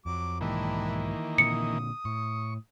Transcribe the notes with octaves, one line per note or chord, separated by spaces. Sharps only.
F2 F#3 D6
B1 G#2 D#3 E3 A#3 D4 E4 G4
A#2 D3 D#6 C#7
A2 C#6